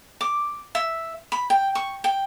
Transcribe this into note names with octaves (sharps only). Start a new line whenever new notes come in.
D6
E5
B5
G5
C#6
G5